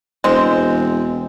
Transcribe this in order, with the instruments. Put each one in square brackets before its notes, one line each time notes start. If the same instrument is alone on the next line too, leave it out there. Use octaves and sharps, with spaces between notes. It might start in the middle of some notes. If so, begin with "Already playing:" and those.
[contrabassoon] E1 [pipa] G#3 C4